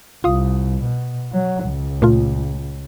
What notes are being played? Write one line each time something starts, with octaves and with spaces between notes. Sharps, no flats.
C2 F4 F5 D#6
B2
F#3
C#2
A#2 A3 F4